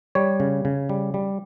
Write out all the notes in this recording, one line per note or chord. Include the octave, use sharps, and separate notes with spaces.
G3 C#5
C#3
C#3
G3
G3